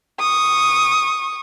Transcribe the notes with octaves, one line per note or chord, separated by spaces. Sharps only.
C#6 D#6